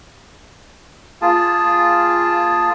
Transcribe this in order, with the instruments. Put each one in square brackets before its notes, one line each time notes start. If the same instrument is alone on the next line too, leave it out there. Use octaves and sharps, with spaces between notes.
[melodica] A#3 F4 G#4 A5